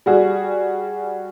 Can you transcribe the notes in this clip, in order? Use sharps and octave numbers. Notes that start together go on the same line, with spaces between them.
G3 F#4 G#4